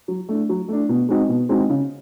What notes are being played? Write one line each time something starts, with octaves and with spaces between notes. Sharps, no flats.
F#3
A3 D4
F#3
A3 D4
B2
G#3 C4 D#4 F#4
B2
G#3 C4 D#4 F#4
C#3